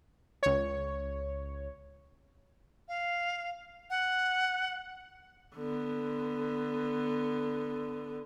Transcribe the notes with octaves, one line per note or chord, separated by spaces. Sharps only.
C#2 C#5
F5
F#5
D3 B3